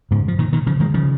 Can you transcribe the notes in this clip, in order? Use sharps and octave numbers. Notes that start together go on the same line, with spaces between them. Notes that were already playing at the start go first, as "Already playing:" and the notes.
G#2 C#3
F3
A#2 D#3
A#2 D#3
C#3 F3
D#3 G#3
C#3 F3